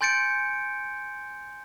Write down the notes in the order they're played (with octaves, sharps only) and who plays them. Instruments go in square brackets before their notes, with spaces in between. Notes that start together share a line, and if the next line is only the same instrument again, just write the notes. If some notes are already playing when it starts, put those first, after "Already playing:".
[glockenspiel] G#5 C6 G6 A6 C#7 D7